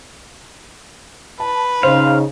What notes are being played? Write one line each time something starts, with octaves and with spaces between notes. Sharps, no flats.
B4 A5
C#3 D#4 C5 F5